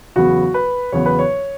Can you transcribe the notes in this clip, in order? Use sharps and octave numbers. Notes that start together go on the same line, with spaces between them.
E2 C#3 F#3 B3 F#4
B4
E2 C#3 F#3 B3 C#5
B4
C#5